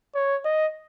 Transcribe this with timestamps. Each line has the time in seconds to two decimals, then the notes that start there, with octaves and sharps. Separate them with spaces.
0.15 C#5
0.45 D#5